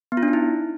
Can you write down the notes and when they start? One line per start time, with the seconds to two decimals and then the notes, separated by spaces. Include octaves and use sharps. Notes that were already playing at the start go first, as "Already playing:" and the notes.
0.12 B3
0.17 F4
0.23 D4
0.28 D#4
0.33 E4